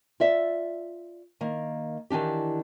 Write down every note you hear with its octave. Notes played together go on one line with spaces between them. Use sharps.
F4 D5 E5
D#3 A#3
D#3 E3 D4 G4